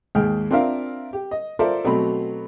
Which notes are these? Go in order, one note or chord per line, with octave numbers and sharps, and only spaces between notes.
D#2 G#2 G#4 G5 F6
C4 D4 F4 A#4 E5 F5
G4
D#5
F4 A4 A#4 C5 D5 E5
B2 F#3 A3 C4 B5